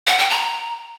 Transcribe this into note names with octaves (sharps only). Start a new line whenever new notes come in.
F#5
G5
A#5